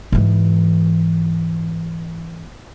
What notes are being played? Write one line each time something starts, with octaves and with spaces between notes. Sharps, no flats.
G#2 E3